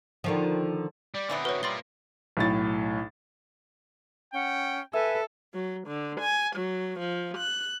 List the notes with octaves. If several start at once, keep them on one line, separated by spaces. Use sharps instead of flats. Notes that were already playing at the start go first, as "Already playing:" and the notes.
D3 D#3 F3
G3 D5
D3 E3 F#3 B3 C4
F#4 B4 C#5
G3 A#3 F4 C6 A6 G7
B1 A2 A6
C#4 F#5 G5
A4 B4 E5 G#5
F#3
D3
G#5
F#3
F3
F#6